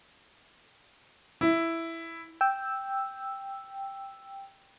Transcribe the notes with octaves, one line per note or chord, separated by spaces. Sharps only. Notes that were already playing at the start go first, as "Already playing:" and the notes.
E4
G5 E6